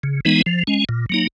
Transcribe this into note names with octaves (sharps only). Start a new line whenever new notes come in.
C#3
E3 G#3 B3 D#4
F3
G#3 C#4
A#2
F#3 A#3 D#4